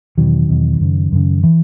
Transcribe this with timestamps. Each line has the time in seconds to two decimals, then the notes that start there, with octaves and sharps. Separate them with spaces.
0.18 E2 B2 D#3 F#3
0.49 E2 B2
0.80 F#2 C#3
1.12 F#2 C#3
1.43 E3